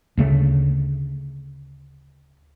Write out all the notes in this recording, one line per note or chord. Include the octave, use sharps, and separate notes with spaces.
D2 C#3 A3